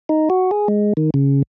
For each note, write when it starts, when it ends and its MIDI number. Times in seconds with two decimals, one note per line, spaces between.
0.09 0.29 63
0.30 0.51 66
0.51 0.68 68
0.68 0.93 56
0.97 1.10 51
1.14 1.43 49